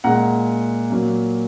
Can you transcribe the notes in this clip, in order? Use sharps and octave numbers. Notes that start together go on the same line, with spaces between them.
A#2 G#3 F#5 A#5
A#2 F#3 A#3